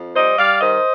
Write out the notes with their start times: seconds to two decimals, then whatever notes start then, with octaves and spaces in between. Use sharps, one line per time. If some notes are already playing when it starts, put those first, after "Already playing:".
Already playing: F2
0.15 G3 C5 D#5
0.39 G3 D5 F5
0.61 D#3 C5 D#5